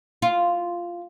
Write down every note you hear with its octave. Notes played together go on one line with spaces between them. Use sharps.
F4